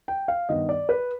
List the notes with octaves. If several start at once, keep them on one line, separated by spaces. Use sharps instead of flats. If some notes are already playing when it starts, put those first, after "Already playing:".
G5
F5
G2 D#3 B3 D#5
D5
B4